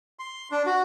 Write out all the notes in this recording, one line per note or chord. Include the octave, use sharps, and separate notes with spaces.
C6
D4
F#4